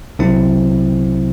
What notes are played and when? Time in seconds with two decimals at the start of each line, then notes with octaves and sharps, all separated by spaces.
0.19 C2 C3 F#3 C4 E4